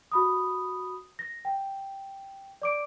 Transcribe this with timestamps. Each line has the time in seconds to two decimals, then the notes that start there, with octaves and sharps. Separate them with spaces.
0.12 F#4 B5 D#6
1.19 A#6
1.45 G5
2.62 D5 D6 D7